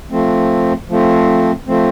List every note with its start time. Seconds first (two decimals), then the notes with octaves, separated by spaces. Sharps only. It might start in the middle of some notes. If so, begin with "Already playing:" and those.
0.10 F3 A3 C4
0.89 F3 A3 C4
1.67 F3 A3 C4